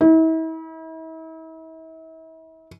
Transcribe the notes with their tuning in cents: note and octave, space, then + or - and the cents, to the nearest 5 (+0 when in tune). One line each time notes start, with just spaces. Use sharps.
E4 -40